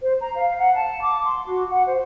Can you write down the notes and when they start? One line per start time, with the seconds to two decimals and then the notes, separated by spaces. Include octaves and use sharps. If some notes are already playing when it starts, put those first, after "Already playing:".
0.01 C5
0.20 A#5
0.35 F5
0.58 F#5
0.74 A5
1.00 D6
1.24 C6
1.47 F#4
1.69 F#5
1.87 C5